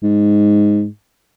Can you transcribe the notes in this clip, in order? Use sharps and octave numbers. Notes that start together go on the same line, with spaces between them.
G#2